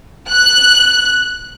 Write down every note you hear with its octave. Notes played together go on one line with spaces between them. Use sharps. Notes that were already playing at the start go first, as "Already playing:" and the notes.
F#6